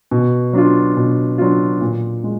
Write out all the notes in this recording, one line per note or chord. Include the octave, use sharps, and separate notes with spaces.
B2
F#3 D4 F4
B2
F#3 D4 F4
A#2
G#3